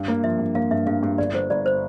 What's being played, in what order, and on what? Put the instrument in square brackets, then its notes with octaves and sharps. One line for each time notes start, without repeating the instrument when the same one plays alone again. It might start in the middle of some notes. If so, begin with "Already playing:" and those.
Already playing: [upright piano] G2
A#3
[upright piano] F3 [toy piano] E5
[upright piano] G2
[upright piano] A#3 [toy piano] F5
[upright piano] G2 [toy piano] E5
[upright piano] G2 [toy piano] F5
[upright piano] G2
[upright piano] G1 [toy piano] D5
[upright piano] G1 [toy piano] C5
[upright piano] G1 [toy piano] D5
[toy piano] C5